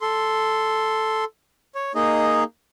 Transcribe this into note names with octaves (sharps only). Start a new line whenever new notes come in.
A4 C6
C#5
A#3 D#4 G#4 D#5